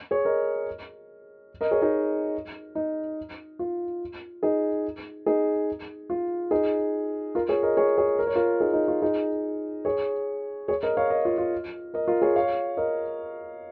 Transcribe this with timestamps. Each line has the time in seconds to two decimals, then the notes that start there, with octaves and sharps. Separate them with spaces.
0.11 G#4 C#5
0.25 A#4 D#5
1.61 A#4 D#5
1.71 G#4 C#5
1.82 D#4 G#4
2.75 D#4
3.59 F4
4.43 D#4 G#4
5.26 D#4 G#4
6.10 F4
6.51 D#4 G#4
7.35 F4 A#4
7.49 G#4 C#5
7.63 A#4 D#5
7.77 G#4 C#5
7.98 G#4 C#5
8.19 A#4
8.27 C#5
8.35 F4 A#4
8.60 D#4 G#4
8.73 D#4
8.88 F4
9.02 D#4 G#4
9.85 G#4 C#5
10.68 G#4 C#5
10.83 A#4 D#5
10.97 C#5 F5
11.10 A#4 D#5
11.25 F4
11.38 F4
11.94 A#4 D#5
12.08 F4 A#4
12.22 G#4 C#5
12.36 C#5 F5
12.77 A#4 D#5